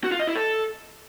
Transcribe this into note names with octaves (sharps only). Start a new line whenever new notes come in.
F#4
F4
D#5
E4
A4